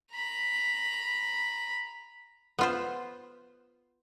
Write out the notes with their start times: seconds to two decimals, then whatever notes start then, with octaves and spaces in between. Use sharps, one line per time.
0.12 A#5 B5
2.59 B3 F4 C5